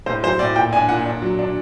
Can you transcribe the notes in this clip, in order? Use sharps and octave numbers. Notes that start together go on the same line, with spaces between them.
A2 C5
F#3 C5
A2 D5
A#2 G5
D4 G#5
A#2 F#5
D4
F#3
D4